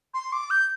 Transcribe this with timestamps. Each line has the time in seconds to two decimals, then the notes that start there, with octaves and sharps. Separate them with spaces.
0.14 C6
0.32 D6
0.50 G6